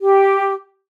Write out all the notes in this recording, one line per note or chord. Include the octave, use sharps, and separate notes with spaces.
G4